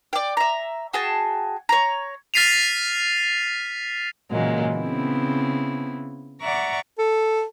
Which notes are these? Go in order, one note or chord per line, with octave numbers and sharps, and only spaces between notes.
D5 G5
E5 A#5
F#4 G#4 G5 A5
C#5 A#5
F6 A6 B6 C7 D#7 F7
A#2 C#3 E3 F#3 G#3 A#3
C#3 B3 C4 E4
D5 E5 F#5 A#5 C#6 D6
A4